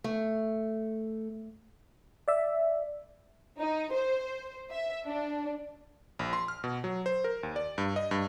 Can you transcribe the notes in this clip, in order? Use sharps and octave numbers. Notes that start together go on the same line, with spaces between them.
A3
D5 E5
D#4
C5
E5
D4
A#1
C6
F6
B2
F#3
C5
A#4
D#2
D5
G2
D#5
G2